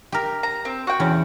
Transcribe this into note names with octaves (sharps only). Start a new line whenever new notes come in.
G4 A#4
A#5
C4
F#4 G5
E2 C#4